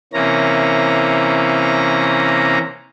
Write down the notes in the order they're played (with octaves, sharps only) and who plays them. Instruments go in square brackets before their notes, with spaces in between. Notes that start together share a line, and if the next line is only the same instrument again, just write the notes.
[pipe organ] C3 E3 A#3 C#4 A#5